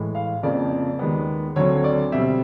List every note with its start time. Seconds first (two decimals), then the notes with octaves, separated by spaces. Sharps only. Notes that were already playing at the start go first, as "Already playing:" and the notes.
Already playing: A2 E3 G#3
0.15 F5
0.43 F2 C#3 F3 A#3 D5
0.99 D#2 D#3 G#3 B3
1.56 D2 D3 F#3 A3 C4 C#5
1.77 C#5
1.84 D5
2.12 B2 G3 C4 E5